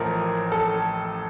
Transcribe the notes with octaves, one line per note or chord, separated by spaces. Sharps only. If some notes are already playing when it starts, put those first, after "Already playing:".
Already playing: A1 A2 F3 A#4
A4